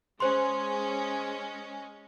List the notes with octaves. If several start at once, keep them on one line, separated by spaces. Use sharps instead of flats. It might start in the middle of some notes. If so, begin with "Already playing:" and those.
G#3 C#4 C5 C6